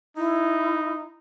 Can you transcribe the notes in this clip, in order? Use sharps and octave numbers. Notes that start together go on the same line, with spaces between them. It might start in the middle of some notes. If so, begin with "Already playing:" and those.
D#4 E4